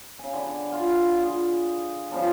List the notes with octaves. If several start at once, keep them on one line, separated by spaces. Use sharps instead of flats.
C#3 G#5
D3 B5 D6
F4
F4 G#4
C#3 F3 G3 D4